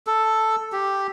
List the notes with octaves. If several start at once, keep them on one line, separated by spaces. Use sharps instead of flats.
A4
G4